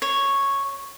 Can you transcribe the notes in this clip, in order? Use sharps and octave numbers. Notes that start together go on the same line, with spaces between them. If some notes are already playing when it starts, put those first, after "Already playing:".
C#5